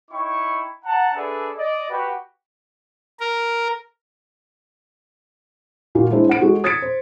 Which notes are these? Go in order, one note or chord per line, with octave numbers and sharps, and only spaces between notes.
D#4 E4 C#5 G5 C#6
F#5 A5 A#5
D4 G#4 A4 B4 D5 E5
D5 D#5
F#4 G4 B4
A#4
A#2 A#3 F4 F#4
G#3 D4 E4 C5
C5 F#5 D7
G#3 F#4 G#4 A4
D#6 G#6 A6 B6 C#7 D7
C5